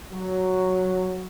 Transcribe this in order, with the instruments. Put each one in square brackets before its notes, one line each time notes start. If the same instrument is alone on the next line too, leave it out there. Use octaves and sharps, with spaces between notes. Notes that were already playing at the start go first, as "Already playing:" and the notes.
[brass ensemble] F#3